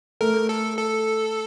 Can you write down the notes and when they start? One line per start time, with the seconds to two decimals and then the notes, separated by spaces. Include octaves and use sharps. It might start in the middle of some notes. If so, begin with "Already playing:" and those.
0.21 A3 A#4
0.49 A4
0.78 A4